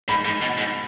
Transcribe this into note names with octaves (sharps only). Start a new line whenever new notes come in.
G#2 B5
G#2
B2
G#2